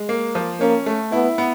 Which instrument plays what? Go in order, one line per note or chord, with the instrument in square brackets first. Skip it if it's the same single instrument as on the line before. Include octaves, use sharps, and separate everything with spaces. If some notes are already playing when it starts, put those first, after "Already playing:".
Already playing: [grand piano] G#3
A#3
F3
[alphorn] A#3 [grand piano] C#4
[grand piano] A3
[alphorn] B3 [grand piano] E4
[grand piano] B3